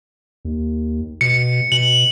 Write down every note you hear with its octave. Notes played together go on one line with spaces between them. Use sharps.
D#2
B2 C#7
B2 F#7